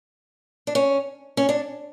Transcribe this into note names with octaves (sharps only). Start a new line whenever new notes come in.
D4
C#4
C#4
D4